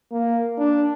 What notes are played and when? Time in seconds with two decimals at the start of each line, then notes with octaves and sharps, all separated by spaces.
0.12 A#3
0.58 D4